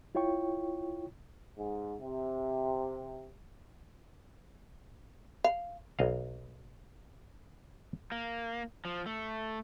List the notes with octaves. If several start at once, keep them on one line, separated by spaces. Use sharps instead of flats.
E4 F4 C#5 G5 C#6
G#2
C3
F5
B1 D#5 F5
A#3
F3
A3